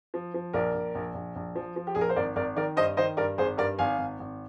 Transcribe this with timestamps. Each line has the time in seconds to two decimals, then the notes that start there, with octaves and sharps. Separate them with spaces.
0.14 F3
0.34 F3
0.53 A#1 A#4 D5
0.74 A#1
0.95 A#1
1.14 A#1
1.36 A#1
1.55 F3
1.76 F3
1.87 G4
1.95 A#1 G#4
2.01 A#4
2.09 C5
2.16 G#1 A#4 D5
2.36 G#1 A#4 D5
2.56 D#3 A#4 D5
2.77 G2 C5 D#5
2.97 D#3 C5 D#5
3.17 G2 A#4 D5
3.38 G#1 G#4 C5
3.57 G2 A#4 D5
3.78 G#1 F5 G#5
3.98 G#1
4.19 G#1